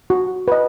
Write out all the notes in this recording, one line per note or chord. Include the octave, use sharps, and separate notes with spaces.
F#4
B4 D#5